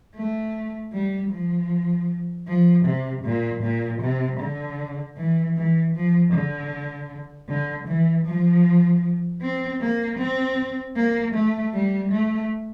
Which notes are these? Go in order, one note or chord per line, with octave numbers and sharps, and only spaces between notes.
A3
G3
F3
F3
C3
A#2
A#2
C3
D3
E3
E3
F3
D3
D3
E3
F3
C4
A#3
C4
A#3
A3
G3
A3